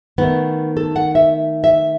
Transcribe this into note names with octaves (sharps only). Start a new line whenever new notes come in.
D#3 A3 B3
A4
F#5
E5
E5